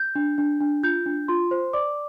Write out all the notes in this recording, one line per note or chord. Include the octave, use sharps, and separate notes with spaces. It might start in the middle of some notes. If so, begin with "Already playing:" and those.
Already playing: G6
D4
D4
D4
F4 G6
D4
F4 C6
C5
D5 D6